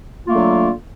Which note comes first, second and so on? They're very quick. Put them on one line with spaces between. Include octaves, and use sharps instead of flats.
F4 A#3 A3 F#3 D3